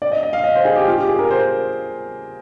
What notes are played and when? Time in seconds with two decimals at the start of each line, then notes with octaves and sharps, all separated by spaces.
0.02 D5
0.12 D#5
0.23 D#5
0.33 F5
0.44 D#5
0.56 C5
0.65 G#4
0.76 G4
0.88 F4
0.98 G4
1.09 G#4
1.19 A#4
1.31 C5